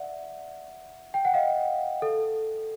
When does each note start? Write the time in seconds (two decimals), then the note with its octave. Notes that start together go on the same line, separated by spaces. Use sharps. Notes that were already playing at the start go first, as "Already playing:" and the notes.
Already playing: D5 E5 F#5
1.14 G5
1.25 F#5
1.34 D#5 F5
2.02 A4